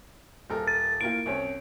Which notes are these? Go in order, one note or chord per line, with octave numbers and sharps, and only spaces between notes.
D#1 A4 A#4
A6
A2 A#3 F4 D7
C2 C#4 C#5